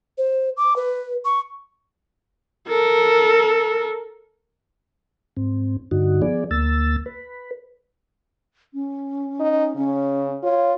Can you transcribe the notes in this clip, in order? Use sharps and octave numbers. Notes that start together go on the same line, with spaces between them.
C5
D6
B4
C#6
A4 A#4
G#2 C4
G2 D3 D#4 F#4
F3 B3 G#4 D5
D2 A#3 E6 A6
B4
C#4
D#4
C#3 C#4
F4 C#5